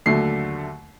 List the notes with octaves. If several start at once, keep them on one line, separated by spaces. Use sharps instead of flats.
D#2 D3 F#3 A3 C7